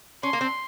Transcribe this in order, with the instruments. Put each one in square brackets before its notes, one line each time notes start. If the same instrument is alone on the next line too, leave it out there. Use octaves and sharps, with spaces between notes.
[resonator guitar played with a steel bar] C#4 [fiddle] C6
[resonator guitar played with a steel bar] A#3
C4